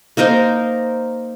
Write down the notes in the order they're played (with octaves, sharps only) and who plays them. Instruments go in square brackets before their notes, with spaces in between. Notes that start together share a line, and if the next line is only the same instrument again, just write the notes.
[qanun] A#3 D#4 A#4 C5